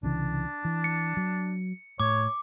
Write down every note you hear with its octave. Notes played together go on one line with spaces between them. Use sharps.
C2 C#3 E3 D4
E3
C#7
F#3
A2 C#5 D6